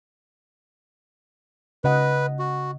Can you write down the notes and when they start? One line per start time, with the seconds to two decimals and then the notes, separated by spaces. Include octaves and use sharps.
1.84 C#3 B4 D#5 F#5
2.39 F#4